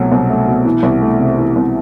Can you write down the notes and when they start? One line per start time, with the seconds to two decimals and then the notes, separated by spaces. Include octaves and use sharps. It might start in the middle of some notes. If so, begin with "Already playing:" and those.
Already playing: C2 B2 F#3 A3
0.12 C2
0.30 A3
0.47 B2
0.65 E3
0.83 C2
1.02 A3
1.19 C3
1.38 E3
1.56 C2